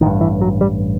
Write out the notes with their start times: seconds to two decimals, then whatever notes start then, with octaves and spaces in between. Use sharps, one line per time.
0.01 A1 D#3
0.06 G2
0.21 E3
0.41 F#3
0.61 G3